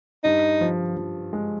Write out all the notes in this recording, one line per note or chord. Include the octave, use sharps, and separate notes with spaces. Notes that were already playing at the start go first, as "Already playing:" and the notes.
G2 D#4
F3
F3
G#3